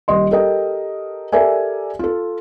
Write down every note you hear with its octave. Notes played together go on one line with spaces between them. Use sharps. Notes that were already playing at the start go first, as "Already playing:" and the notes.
D#1 G4 D#5 C6
G4 A4 A#4 D#5 G5
G4 A4 A#4 D5 E5 G#5
F4 A4